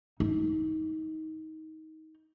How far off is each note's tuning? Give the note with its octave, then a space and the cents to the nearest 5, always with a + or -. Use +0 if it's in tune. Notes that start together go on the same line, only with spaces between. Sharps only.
D#4 +20